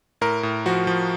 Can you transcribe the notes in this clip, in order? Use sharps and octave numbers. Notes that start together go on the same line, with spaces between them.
A2 A#4
A2
F3 F#4
F3